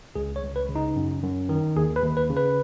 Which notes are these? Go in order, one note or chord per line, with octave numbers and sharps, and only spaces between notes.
C#2 G#4
C#5
C#2
B4
C#3
D#4
F#2
F#2
D#3
D#2 G#4
B4
D#2
B4
C#3
B4